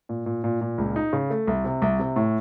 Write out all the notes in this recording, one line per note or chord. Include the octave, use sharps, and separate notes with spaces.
A#2
A#2
A#2
A#2
C#2
D#4
C#3
A3
C2
C3
C2
C3
A2